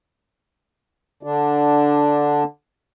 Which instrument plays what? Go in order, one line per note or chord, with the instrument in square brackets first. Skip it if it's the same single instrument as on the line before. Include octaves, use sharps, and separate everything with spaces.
[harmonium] D3 D4